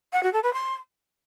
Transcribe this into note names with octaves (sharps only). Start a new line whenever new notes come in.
F#5
F#4
A4
B4
C6